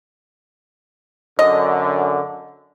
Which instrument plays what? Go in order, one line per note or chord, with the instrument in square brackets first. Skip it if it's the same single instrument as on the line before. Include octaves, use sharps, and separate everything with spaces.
[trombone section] F#2 D3 [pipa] D#5